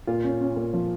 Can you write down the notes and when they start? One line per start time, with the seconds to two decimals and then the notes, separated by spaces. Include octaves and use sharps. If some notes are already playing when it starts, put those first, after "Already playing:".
0.08 A#2 F4
0.24 C#4
0.41 C#4
0.56 A#2
0.73 F3